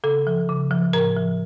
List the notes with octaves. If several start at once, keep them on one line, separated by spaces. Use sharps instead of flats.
C#3 A4
F3
C#3
F3
A2 A#4
F3